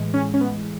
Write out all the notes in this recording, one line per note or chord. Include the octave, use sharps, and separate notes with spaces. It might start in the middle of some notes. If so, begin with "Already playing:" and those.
Already playing: A2 E3 G#3
C#4
C#4
B3